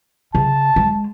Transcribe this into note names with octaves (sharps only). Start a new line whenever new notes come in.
C#3 A5
G#3